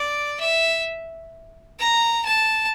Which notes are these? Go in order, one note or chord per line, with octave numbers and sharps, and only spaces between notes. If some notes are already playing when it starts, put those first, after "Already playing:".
Already playing: D5
E5
A#5
A5